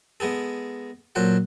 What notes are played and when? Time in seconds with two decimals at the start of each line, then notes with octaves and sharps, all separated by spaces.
0.20 G#3 B3 G#4 A4
1.15 A#2 F#3 A4 C5 F#5